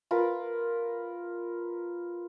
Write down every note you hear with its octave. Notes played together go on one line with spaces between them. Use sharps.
F4 A#4 B4